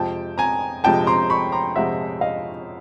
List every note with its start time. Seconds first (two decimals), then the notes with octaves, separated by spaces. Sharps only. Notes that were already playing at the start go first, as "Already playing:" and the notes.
Already playing: F2 C3 F3 G#3 G5 A5
0.38 G#5 A#5
0.84 F2 C3 F3 G#3 G5 A5
1.07 A#5 C6
1.30 B5 C#6
1.52 A#5 C6
1.76 F2 C3 F3 G#3 E5 F#5
2.21 D#5 F5